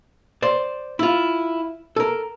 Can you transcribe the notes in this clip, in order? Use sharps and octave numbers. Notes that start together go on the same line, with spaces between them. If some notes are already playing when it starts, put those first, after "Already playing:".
C5 D5
E4 F4
A4 A#4